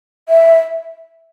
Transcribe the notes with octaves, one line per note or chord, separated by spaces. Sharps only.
E5